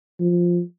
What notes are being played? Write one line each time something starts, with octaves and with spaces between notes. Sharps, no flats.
F3